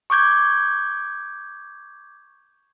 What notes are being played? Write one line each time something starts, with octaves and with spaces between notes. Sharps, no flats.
C#6 D6 G6 G#6